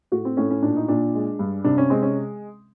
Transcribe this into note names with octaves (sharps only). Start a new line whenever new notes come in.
A2 F#4
C4
A2 C#4
C#4
A#2 D4
D#4
A#2 D4
G#3
G2
C3 D4
C#4
G#3 C4
C#4